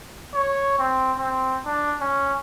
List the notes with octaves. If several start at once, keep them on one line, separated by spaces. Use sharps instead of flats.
C#5
C4
C4
D4
C#4